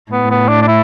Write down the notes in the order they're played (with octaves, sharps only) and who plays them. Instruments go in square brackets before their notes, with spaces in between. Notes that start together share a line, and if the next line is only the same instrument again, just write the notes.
[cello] A2 [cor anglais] B3
[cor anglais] B3
D4
D4
E4